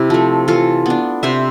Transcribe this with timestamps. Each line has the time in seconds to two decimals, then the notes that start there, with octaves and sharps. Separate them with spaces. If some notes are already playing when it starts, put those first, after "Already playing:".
Already playing: C3 E4 G4
0.10 F3 A3
0.48 E3 F4 A4
0.86 B3 D4
1.23 C3 C5 E5